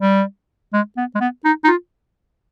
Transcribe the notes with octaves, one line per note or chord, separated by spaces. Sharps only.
G3
G#3
B3
G#3
B3
D#4
D#4
F4